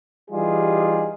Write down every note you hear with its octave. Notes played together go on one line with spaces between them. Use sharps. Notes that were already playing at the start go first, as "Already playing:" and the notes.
E3 G3 D#4 F4 G4 G#4